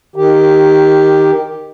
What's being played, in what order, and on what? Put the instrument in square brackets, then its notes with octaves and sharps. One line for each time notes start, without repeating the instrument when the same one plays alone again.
[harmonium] D#3 G4